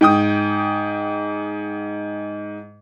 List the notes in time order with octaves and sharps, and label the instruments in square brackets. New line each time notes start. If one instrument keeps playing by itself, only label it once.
[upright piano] G#2 G5 D#6